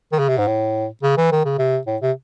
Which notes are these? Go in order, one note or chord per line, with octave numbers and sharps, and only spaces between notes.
D#3
C#3
C3
G#2
A2
C#3
E3
D#3
C#3
C3
A2
C3